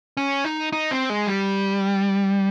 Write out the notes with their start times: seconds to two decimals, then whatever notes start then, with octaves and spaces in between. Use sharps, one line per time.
0.17 C#4
0.45 D#4
0.73 D#4
0.91 C4
1.10 G#3
1.27 G3